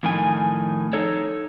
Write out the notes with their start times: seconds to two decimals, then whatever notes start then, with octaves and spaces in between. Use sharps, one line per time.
0.03 F2 A2 D#3 G#5
0.93 D#4 A4 C#5